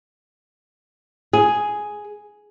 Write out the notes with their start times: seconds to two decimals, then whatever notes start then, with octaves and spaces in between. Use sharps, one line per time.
1.33 G#4